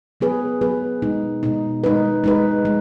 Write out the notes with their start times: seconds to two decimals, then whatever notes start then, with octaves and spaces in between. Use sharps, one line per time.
0.21 F#3 B3 G#4 B4
0.61 F#3 B3 G#4 B4
1.02 B2 G#3 D#4
1.43 B2 G#3 D#4
1.84 G#3 D#4 B4
2.24 G#3 D#4 B4
2.65 G#3